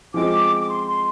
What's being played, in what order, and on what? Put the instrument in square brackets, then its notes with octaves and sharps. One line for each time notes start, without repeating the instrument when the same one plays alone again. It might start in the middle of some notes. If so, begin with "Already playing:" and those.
[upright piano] F3 G#3 C4 [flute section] D6
[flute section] D6
C6
C6